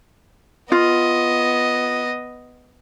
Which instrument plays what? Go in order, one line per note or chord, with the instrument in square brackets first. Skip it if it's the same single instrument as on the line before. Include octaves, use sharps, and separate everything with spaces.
[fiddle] B3 D#5 [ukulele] F4